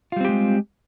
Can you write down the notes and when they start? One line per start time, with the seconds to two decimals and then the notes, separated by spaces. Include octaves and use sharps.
0.12 F4
0.16 G3
0.20 C4
0.25 G4
0.29 G#3